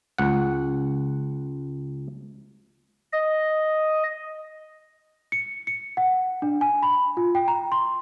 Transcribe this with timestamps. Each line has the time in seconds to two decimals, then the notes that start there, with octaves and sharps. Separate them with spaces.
0.18 C#2 F#5
3.13 D#5
5.32 C#7
5.67 C#7
5.97 F#5
6.42 D4
6.61 G#5
6.83 B5
7.17 F4
7.35 G5
7.48 A#5
7.72 C6